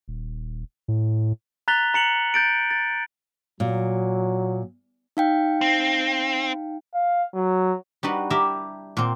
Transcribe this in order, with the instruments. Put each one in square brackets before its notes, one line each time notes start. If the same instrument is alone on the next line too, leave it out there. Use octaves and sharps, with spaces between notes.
[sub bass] D#1
A2
[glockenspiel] A#5 F#6 A6 B6 F7 G7
A#5 C#7 F#7
G6 A6 D7
A6
[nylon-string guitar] A#2 [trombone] F#3
[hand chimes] D#4 F5 G5
[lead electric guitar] C4
[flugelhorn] F5
F#3
[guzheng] G3 D4 D#4 F#4 B4 F#5
E4 G4 A#4 E5
A#2 C4